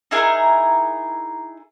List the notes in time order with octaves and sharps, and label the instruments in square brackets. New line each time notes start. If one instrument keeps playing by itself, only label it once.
[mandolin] D#4 E4 G#4 A#4